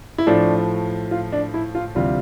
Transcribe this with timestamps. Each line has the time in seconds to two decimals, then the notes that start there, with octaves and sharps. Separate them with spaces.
0.18 E4
0.27 A2 F3 A3 D4
1.11 F4
1.32 D4
1.54 E4
1.75 F4
1.95 D2 C3 E3 G3 C4 F4